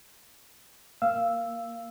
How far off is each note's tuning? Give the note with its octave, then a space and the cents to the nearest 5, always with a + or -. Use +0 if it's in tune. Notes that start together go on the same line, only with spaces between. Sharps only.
A#3 +0 F5 -15 E6 +0